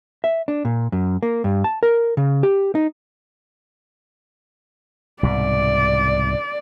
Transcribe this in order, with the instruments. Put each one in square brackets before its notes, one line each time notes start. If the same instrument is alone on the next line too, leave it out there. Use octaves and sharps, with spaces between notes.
[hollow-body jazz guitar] E5
D4
A#2
F#2
A#3
G2
A5
A#4
C#3
G4
D#4
[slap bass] C2 G#2 B2 [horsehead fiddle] D5